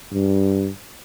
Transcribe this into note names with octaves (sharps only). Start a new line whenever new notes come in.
G2